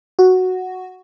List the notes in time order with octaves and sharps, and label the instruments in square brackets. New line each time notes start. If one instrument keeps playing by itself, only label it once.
[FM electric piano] F#4